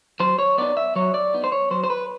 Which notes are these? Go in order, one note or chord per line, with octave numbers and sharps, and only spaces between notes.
F#3 C5
C#5
B3 D#4 D5
E5
F#3 C#5
D5
B3 D#4
C5
C#5
F#3 C5
C5
B4